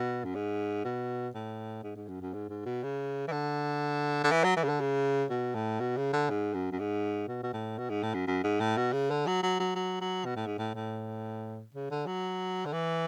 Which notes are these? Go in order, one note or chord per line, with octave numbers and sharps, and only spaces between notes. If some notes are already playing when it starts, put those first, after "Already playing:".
Already playing: B2
F#2
G#2
B2
A2
G#2
G#2
F#2
F#2
G#2
G#2
B2
C#3
E3
D3
D3
E3
F#3
E3
C#3
D3
C#3
B2
A2
B2
C#3
D3
G#2
F#2
F#2
G#2
B2
B2
A2
B2
G#2
A2
F#2
F#2
G#2
A2
B2
C#3
D3
F#3
F#3
F#3
F#3
F#3
B2
A2
G#2
A2
A2
C#3
D3
F#3
D3
E3